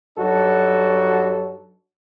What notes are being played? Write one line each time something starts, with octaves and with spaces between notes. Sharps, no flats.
G2 F#3 D#4 F#4 A4